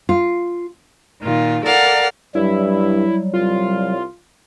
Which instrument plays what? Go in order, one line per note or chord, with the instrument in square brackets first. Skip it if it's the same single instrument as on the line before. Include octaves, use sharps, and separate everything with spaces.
[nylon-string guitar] F4
[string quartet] A#2 D#3 F4
A4 A#4 D5 F5 F#5
[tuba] G2 [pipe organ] F#3 G3 [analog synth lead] E4
[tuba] C2 [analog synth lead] F4